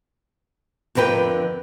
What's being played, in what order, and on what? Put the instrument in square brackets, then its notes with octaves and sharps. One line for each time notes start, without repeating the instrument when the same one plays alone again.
[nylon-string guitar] F2 D3 A#4 B4 G5